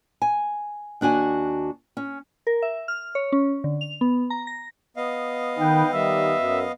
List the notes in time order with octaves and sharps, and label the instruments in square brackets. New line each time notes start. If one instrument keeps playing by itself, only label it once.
[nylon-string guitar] G#5
D#2 D4 F#4 G#5
C#4
[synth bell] A#4
E5
F6
C#5
C#4
D3
F7
B3
A#5
A#6
[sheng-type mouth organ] B3 D#5 F5
[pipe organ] D#3 [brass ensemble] B4 G5
[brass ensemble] D#3 G3 [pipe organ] E5
[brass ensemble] F#2